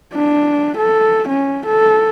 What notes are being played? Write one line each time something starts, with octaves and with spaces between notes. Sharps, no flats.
D4
A4
C#4
A4